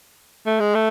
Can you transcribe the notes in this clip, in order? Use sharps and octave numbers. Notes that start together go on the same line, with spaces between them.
A3
G#3
A3